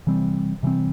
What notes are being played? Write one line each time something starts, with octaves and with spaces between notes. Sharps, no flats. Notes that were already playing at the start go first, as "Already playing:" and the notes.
C3 E3 G3 C4
C3 E3 G3 C4